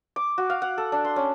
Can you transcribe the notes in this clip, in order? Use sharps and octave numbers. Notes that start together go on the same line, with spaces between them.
D6
F#4
F5
F#5
A4
D4
C6
C#4